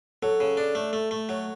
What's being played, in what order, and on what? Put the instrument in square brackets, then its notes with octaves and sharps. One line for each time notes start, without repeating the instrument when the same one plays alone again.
[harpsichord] F#3 [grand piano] A4
[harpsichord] C#3
D4
A3
A3
A3
F#3